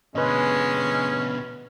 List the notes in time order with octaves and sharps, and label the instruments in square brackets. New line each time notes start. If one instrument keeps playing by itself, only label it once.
[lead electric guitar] B2 D3 [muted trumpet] G#3 [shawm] C#4 [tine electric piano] B4 D#5